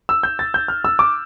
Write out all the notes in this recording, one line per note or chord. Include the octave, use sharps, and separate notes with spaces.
E6
G6
A6
G6
F6
E6
D6